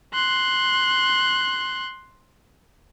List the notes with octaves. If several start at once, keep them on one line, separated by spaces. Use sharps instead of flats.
C6 F#6